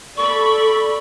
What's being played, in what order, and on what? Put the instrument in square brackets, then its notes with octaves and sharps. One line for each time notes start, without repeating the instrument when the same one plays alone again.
[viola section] A4 D5 B5 [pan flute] C#6